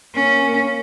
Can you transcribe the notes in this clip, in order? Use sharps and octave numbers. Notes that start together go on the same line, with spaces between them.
A#3 C#4
A#3